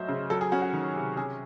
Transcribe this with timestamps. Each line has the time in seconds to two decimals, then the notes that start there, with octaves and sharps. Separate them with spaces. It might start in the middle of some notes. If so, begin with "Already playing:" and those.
Already playing: F#3 A3 C#4 C5 D#5 E5
0.09 C#3
0.30 F#3 A4
0.41 G#4
0.52 C#4 F#4
0.62 F#4
0.73 D#3
0.95 C3
1.17 C#4 G#4